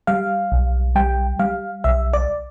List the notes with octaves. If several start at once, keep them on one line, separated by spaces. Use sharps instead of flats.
G3 F5
B1
G3 G5
G3 F5
B1 E5
D5